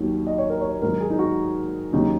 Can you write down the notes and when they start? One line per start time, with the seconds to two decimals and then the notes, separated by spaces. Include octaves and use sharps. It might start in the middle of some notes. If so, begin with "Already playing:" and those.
Already playing: D#2 D#3 F#3
0.27 D#5
0.38 C#5
0.50 A#4
0.61 C#5
0.82 G#2 D#3 F#3 A#4
1.00 G#4
1.10 D#4
1.19 F#4
1.93 D#2 C#3 F#3 D#4